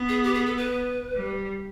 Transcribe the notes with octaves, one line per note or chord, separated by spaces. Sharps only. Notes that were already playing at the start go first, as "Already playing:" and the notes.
Already playing: B3
G#4
G4
G#4
A4
B4
G3